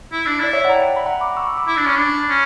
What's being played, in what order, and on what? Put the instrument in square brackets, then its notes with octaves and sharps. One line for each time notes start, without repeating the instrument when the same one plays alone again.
[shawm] E4
D4
[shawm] E4 [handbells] D5
[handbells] C#5 E5
D5 F#5
A#5
E5 G5
B5
F#5 A#5
B5 D6
C#6 E6
B5 D6
[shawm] E4 [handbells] B5 D6
[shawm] D4
[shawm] C#4 [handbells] C#6
[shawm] D4 [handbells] B5 D6
[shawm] C#4